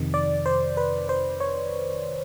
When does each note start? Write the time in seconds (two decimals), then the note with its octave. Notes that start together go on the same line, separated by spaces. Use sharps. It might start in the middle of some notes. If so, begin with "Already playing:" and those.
Already playing: F2 C3 D#3
0.14 D5
0.46 C5
0.77 B4
1.09 C5
1.40 C#5